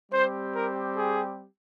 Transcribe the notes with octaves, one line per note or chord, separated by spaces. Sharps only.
G3 C4 G4 C5
A#4
G#4